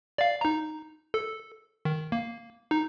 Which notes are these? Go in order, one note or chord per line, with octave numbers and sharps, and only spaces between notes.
D5 F5
D#4 A#5
A4
D#3
A#3
D#4